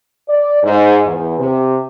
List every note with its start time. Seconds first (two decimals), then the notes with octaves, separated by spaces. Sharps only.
0.27 D5
0.63 G#2
1.05 E2
1.38 C3